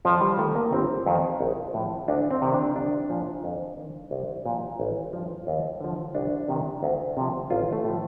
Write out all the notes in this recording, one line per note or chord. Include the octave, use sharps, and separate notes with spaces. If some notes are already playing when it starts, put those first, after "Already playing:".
F2 F3
G3
D#3 A3
A#3
G1 C4
F2 D#3
A#1
A2 F3
D2 D4
C4
C3 D#3
D4
C2 D4
A#2 F3
F2
D#3
C2
A#2 F3
A1
G2 F3
D#2
D3 F3
C2 D4
C3 D#3
D2
C3 F3
A1 F4
A3
A2 F3